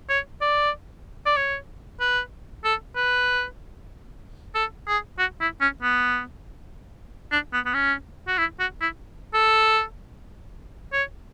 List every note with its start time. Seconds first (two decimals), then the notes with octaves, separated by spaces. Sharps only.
0.09 C#5
0.41 D5
1.26 D5
1.36 C#5
2.00 B4
2.65 A4
2.96 B4
4.55 A4
4.88 G#4
5.19 F#4
5.41 E4
5.61 C#4
5.83 B3
7.32 D4
7.53 B3
7.66 B3
7.74 C#4
8.27 F#4
8.38 E4
8.60 F#4
8.81 E4
9.34 A4
10.93 C#5